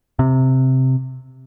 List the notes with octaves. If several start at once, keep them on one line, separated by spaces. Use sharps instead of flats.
C3